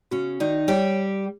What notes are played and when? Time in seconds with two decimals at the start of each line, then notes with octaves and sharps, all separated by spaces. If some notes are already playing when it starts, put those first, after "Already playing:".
0.11 C#3 C#4 F#4
0.40 D#3 D#4 D5
0.68 G3 G4 C#5